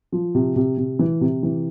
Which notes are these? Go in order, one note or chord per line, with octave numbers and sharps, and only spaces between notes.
F3
C3
C3
C3
E3
C3
E3